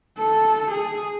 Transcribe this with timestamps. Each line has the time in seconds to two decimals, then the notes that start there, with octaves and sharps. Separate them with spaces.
0.18 A4
0.71 G#4